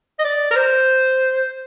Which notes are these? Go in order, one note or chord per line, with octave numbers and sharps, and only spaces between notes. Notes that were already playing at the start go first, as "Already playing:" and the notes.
D#5
D5
A#4
C5